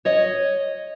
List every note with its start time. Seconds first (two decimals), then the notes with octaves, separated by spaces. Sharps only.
0.05 C#5 D#5